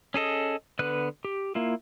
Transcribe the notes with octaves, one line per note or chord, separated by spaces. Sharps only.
C#4 G#4 A4 D#5
D3 B3 B4 F#6
G4
A#3 E4 F4